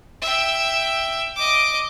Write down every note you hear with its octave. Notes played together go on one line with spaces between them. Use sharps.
E5 G5
D#5 D6